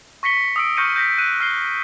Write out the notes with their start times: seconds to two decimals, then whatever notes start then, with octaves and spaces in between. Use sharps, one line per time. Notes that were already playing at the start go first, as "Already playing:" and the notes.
0.23 C#6 A#6 B6 C#7 G7
0.56 D#6 E6 D7
0.77 C#6 F6 G6 A#6 C#7 D#7
0.96 G6 A#6 B6
1.18 F#6 D#7
1.40 F6 C7 G7